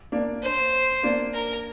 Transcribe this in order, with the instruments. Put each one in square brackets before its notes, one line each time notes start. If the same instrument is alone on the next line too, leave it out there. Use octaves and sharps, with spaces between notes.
[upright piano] A#3 D4
[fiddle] C5
[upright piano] A#3 D4
[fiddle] A#4